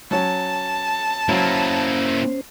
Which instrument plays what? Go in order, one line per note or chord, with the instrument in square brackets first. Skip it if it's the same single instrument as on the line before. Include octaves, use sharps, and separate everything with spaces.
[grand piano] F#3 C#4 [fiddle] A5
[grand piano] F#3 [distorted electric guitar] A#3 E4 [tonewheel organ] C#4 C5